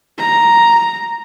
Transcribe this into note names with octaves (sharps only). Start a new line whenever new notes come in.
A#5